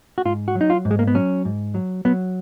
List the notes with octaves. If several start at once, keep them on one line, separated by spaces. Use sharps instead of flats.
F#4
G#2 F4
F#4
F#3
D#4
F4
G#2
G#3
A#3
B3
F#3 C#4
G#2
F#3
F#3 B3